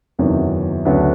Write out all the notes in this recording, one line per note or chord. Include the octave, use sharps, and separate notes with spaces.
F#1 E2 C3 D#3 F#3
D2 C#3 F#3 B3 D4